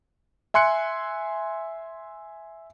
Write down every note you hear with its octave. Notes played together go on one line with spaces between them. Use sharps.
E5 G#5 C6 F#6 C#7